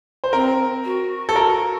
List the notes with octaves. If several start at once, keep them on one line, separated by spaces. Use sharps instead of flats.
C5
C4 A#4
F#4
A4
A#4